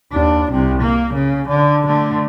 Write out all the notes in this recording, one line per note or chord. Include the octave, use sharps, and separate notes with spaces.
D#2 D4
C2 C3
A#3
C#3
D3
D3 A3